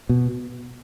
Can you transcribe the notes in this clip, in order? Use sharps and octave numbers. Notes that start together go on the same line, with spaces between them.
B2